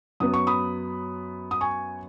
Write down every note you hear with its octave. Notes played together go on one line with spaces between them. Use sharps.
F#2 F#3 B3 D#6
C#6
B5 D#6
D#6
G#5 C#6